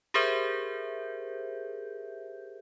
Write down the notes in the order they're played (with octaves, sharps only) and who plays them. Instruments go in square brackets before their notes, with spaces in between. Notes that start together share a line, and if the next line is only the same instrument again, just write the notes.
[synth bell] G4 G#4 A#4 C5 E5 G6